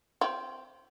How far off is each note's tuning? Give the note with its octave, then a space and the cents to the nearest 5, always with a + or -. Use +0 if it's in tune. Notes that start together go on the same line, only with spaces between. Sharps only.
C4 +0 F4 -45 G5 -40